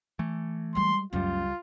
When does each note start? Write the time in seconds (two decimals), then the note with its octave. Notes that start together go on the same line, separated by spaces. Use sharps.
0.19 E3 A3
0.75 G3 G#3 C6
1.13 C#2 F#2 G3 A3 F4